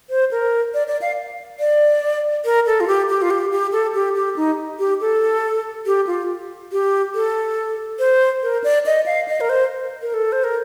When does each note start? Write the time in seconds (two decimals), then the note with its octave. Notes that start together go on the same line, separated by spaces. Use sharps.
0.10 C5
0.31 A#4
0.74 D5
0.87 D5
1.01 F5
1.59 D5
2.45 A#4
2.66 A4
2.80 F4
2.87 G4
3.09 G4
3.22 F4
3.30 G4
3.51 G4
3.72 A4
3.94 G4
4.15 G4
4.36 D#4
4.79 G4
5.01 A4
5.86 G4
6.07 F4
6.72 G4
7.15 A4
7.99 C5
8.43 A#4
8.64 D5
8.86 D#5
9.06 F5
9.28 D#5
9.40 A#4
9.49 C5
10.02 A#4
10.14 A4
10.32 C5
10.44 A#4